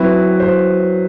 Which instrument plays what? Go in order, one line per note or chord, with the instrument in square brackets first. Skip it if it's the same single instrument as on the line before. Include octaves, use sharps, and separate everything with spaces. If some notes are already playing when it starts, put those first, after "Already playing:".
Already playing: [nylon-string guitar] F#3 C4 E4 [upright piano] B4
[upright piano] C5